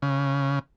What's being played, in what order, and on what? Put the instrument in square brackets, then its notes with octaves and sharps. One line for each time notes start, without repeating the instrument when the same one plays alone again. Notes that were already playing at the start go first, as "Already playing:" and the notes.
[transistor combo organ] C#3